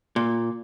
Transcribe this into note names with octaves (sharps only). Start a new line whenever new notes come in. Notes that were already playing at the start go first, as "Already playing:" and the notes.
A#2